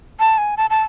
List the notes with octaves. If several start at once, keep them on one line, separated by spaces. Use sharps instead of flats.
A5
G#5
A5
A5